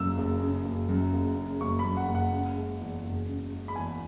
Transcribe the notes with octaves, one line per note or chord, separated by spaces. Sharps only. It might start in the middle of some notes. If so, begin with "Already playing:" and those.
Already playing: F#1 F#2 E6
F#1
C#3
F#1
F#2
F#1
C#3
F#1 C#6
B5
F#2
F#5
F#1
F#5
C#3
G#3
E2
F#1
C#3
G#3
B5
E2 G#5